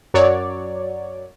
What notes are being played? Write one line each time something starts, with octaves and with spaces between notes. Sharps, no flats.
F#2 F#3 C#5 D5